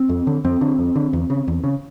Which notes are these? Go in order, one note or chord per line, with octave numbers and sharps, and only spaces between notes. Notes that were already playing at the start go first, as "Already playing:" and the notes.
Already playing: C4
F2
D3
F2 C4
D3
F2
D3
E2
C#3
E2
C#3